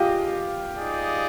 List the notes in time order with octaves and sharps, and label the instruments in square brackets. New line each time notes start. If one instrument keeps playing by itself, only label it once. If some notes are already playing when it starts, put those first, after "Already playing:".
Already playing: [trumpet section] A#3 D4 G#4 D#5 [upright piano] F4 G4
[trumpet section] D#4 G#4 D5